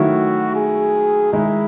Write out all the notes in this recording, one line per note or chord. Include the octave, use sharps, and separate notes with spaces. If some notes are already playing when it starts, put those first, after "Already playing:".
Already playing: D#3 F#3 A3 E4 F#4
G#4
D#3 G#3 D#4 E4